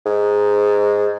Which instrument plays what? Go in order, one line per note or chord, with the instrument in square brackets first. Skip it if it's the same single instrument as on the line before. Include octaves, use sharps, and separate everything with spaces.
[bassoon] G#2